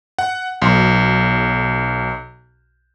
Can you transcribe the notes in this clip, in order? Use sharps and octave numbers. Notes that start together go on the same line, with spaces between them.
F#5
B1